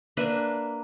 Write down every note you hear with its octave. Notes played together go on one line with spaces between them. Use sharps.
A#3 D4 B4 E5